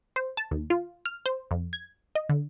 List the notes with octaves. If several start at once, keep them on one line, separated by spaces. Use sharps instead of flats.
C5
A5
D#2
F4
F6
C5
F2
G#6
D#5
D3